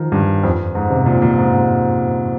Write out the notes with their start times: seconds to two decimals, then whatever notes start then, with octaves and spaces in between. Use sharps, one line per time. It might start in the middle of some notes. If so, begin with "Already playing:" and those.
Already playing: D#3 F3
0.12 G2
0.43 F2
0.75 G#2
0.90 C3
1.06 A#2
1.22 A#2
1.38 G#2
1.53 G#2